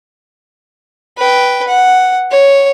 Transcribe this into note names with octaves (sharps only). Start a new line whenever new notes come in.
B4 G5
F#5
C#5